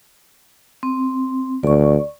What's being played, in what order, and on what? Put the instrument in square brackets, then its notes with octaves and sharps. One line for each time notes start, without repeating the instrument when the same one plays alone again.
[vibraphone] C4
[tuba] D2 [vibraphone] D5 C#6